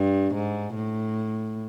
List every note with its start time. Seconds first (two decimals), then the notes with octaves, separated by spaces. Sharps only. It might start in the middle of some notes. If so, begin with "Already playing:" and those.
Already playing: G2
0.34 G#2
0.75 A2